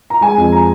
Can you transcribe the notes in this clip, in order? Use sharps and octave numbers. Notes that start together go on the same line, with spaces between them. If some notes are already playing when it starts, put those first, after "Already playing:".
A#5
G#3 G#5
F2
A#5